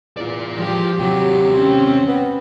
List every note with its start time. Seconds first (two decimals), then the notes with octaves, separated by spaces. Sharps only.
0.17 E2 F4 D5
0.55 F3 G4
0.99 D#2 C3 F#3 G4
1.51 C4 C#4
2.08 B3